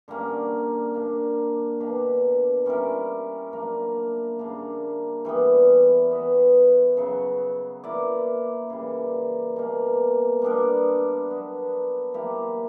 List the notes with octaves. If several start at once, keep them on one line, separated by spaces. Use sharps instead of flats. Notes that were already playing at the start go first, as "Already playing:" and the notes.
D3 G3 A#3 C#4
A#2 A#3 D4
B2 A#3 D4 G4
G3 C#4 E4 A#4
F#3 A#3 D4 A#4
C#3 G3 A#3 D4
E3 G3 B3
E3 B3 F#4 B4
C#3 F#3 B3 F#4
A#3 E4 B4 D5
C#3 E3 G3 A#3
B2 G3 A#3
G3 B3 D4 A#4
F#3 B3 F#4
F#3 A#3 E4 G4